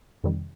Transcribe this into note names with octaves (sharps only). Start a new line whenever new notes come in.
F2 C3 D#3 G3